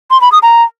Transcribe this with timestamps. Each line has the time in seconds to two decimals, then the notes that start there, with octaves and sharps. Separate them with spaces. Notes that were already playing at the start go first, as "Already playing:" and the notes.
0.11 C6
0.21 B5
0.32 D#6
0.43 A#5